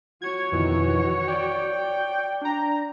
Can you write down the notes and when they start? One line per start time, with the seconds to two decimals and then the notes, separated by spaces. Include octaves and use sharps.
0.22 F#4 C#5 G#6
0.52 F2 B2 D#3 E3
1.28 D5 G5
2.42 D4 A#5